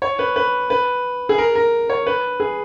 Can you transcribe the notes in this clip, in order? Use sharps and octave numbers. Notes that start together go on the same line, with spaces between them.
C#5
B4
B4
B4
G#4
A#4
A#4
C#5
B4
G#4